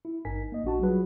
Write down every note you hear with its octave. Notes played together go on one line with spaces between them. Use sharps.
E4
G#1 G2 D#4 A#4 G#5 B6
A#3 D#5
A#1 D4 F#4 A5
F#3 G3 F4 F#4 G#4 B4